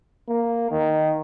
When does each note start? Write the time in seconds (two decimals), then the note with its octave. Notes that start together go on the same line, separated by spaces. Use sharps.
0.29 A#3
0.71 D#3